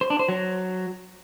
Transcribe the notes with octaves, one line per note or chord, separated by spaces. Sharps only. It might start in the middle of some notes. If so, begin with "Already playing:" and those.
C5
D4
C5
F#3